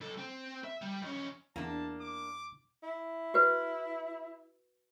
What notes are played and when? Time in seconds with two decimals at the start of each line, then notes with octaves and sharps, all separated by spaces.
0.01 B1 A4
0.18 C4
0.64 E5
0.82 G3
1.02 F2 C#4
1.56 E2 A#3 D4 A5
2.01 D6
2.83 E4
3.34 F#4 B4